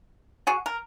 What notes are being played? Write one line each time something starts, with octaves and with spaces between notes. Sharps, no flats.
F#4 G#4
A#4